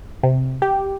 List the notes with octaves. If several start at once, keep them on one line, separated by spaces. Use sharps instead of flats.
C3
G4